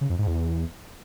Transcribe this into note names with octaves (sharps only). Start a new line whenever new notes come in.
C#3
F2
G#2
E2